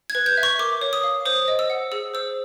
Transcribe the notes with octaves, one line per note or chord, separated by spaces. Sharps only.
G#6
B4
G6
E5
C#6
A#4 D6
C#5
D#6
F5
C5 D#6
D#5
E6
F#5
G#4 E6
C5 E6